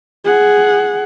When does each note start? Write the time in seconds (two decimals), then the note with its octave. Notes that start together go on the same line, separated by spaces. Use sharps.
0.24 G#4 F#5